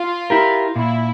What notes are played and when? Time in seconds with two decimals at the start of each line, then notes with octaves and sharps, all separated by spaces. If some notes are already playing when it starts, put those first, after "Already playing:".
Already playing: F4
0.30 E4 G4 A#4
0.75 A#2 E4